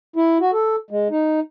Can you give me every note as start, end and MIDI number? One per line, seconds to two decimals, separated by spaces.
0.16 0.38 64
0.40 0.51 66
0.53 0.76 69
0.90 1.08 56
1.10 1.40 63